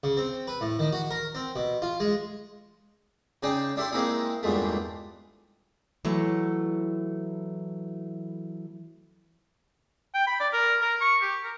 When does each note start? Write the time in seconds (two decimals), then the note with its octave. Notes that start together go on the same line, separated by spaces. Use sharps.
0.04 C#3
0.17 C4
0.48 B4
0.61 A2
0.79 D#3
0.93 F#4
1.11 A#4
1.35 C4
1.56 B2
1.82 F4
2.00 G#3
3.43 C#3 D#4 G#4 D5 G5
3.77 D4 E4 G4 A4 B5 C6
3.92 G#3 A#3 C4 D#4 E4 G#4
4.43 E2 G2 A#2 G#3 A3
6.05 E3 F#3 A3
10.14 G5
10.27 B5
10.40 D5
10.53 A#4
10.81 A#4
11.01 C#6
11.22 G4
11.44 A#4